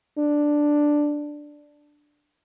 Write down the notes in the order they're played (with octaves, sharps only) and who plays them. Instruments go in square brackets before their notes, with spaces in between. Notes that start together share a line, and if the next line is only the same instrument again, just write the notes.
[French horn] D4